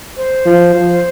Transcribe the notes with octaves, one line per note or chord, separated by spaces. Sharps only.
C5
F3
F3